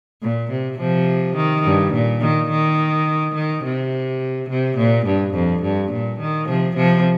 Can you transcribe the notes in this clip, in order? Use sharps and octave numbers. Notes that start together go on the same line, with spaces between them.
A#2
C3
C3 F3
D#3
G2
A#2
D#3
D#3
D#3
C3
C3
A#2
G2
F2
G2
A#2
D#3
C3 F3
C3 F3